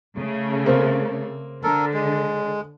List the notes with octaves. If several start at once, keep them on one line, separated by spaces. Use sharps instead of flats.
C#3 A3
A#3 C4
D3 A4 A#4
G#3